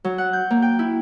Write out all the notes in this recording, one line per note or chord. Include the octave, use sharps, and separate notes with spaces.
F#3
F#5
G6
A#3
G5
E4